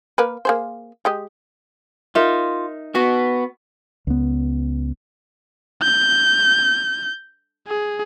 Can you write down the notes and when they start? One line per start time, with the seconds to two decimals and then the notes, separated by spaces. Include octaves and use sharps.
0.18 A#3 A#4 B4
0.45 A#3 G#4 C5
1.05 G#3 G4 D#5
2.15 D#4 F4 A#4 E5
2.95 B3 F#4
4.07 C#2 B3
5.83 G6
7.68 G#4